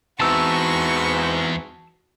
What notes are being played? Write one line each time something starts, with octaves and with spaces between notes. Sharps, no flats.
E2 G#2 E3 C4 F#4 A5 C#6 E6